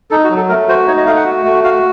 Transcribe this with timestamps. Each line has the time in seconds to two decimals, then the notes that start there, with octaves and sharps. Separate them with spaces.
0.11 D#4 A4
0.24 F#4
0.30 F#3
0.37 A4
0.49 A3 A#4
0.68 F#4 C5
0.88 D#4 C#5
0.97 D#5
1.06 A3 F5
1.16 F#5
1.25 F#4
1.46 A3
1.64 F#4 F5